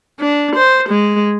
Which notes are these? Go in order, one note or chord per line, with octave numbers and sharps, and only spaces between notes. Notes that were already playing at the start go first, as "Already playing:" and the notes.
D4
C5
G#3